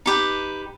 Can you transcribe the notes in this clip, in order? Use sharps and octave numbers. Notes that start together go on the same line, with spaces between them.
D#4 G4 B4